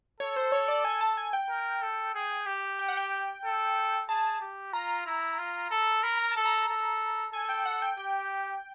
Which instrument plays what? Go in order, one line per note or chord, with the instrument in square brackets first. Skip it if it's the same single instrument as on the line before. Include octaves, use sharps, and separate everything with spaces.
[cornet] A4 [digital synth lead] C#5
[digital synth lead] C5
C#5
D5
G#5
A5
G#5
G5
[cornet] A#4
A4
G#4
G4
[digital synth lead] G5
F#5
G5
[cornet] A4
[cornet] G#4 [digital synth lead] A5
[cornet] G4
[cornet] F4 [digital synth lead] A#5
[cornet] E4
F4
A4
[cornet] A#4 [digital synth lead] B5
[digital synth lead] A#5
A5
[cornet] A4
[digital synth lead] A#5
[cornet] A4
[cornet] A4 [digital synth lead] G#5
[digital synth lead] G5
F#5
G5
[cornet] G4 [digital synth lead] G5